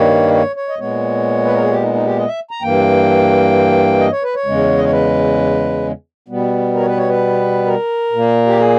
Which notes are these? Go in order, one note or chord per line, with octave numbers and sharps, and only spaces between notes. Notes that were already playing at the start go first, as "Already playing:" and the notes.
Already playing: G2 D#3 G3 A#3 C#5
C#5
C#5
D#5
A#2 G#3 B3 C#5
B4
A#4
G#4
G4
D#4
D#4
G4
D#5
E5
A#5
G2 E3 A#3 G5
D#5
C#5
B4
C#5
E2 C#3 G#3
D#5
C#5
B4
B2 G3 B3
A#4
C#5
B4
C#5
B4
A#4
A#2 A#3
G4
G#4